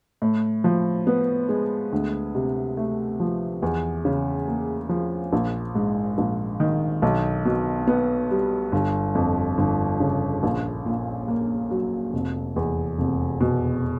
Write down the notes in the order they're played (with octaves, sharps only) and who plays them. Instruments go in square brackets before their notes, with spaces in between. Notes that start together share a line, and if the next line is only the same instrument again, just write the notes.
[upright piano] A2
F3
B3
G#3
D2
C3
A3
F3
E2
C#3
A#3
F3
A#1
G#2
A#1
D#3
B1
B2
B3
G3
G1
F2
G1
C#3
A#1
A#2
A#3
F#3
F1
E2
F1
B2